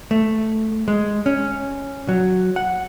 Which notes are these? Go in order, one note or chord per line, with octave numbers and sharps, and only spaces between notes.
A3
G#3
C#4
F#3
F#5